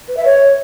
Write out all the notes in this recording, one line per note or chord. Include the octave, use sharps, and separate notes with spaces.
B4
E5
C#5